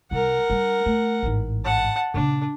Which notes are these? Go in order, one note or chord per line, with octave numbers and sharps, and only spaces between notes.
C2 G3 A#4 F#5
G3 D4
A3
A1 G#2
F#5 A5
A#2 C#3 D4